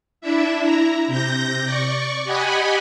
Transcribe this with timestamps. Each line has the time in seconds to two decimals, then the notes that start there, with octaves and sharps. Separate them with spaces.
0.21 D4 E4 E5
0.61 E4 A#5
1.07 C3 G6 A#6
1.64 D5 C#6
2.24 G4 D#5 F#5 G#5 B5